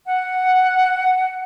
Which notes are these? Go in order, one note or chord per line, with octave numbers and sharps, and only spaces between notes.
F#5